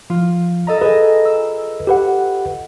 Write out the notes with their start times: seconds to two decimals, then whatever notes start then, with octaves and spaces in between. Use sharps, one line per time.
0.10 F3 F4
0.67 A4 D#5 A#5
0.82 G#4 A#4 B4 D#5 G#5 A#6
1.25 E6
1.87 G4 B4 F#5